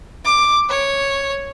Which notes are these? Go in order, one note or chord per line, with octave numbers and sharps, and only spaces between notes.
D6
C#5